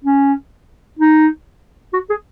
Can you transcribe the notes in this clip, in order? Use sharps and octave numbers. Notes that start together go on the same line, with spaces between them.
C#4
D#4
F#4
G#4